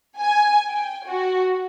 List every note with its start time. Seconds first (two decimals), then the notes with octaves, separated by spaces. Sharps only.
0.20 G#5
0.68 G5
1.07 F#4